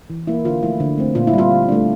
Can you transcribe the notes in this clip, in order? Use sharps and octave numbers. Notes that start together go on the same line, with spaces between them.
E3
A#3 E4
D3 F4
F3 A3 E4
D3
A3 C4
A#2 F4
E4
G3 C4 F4
D3
A3 D4